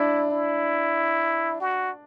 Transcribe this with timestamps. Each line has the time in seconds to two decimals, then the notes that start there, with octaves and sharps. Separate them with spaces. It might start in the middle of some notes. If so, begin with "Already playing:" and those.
Already playing: D4 E4
0.31 E4
1.61 F#4